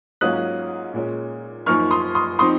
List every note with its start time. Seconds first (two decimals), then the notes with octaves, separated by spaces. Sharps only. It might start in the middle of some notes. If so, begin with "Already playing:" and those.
0.21 G#2 F#3 A#3 C#4 F4 D#6 F#6
0.94 A#2 G#3 C#4
1.66 F#2 F3 A#3 D#4 C#6 F6
1.91 C6 D#6
2.15 C6 D#6
2.39 F3 C4 D#4 C6 D#6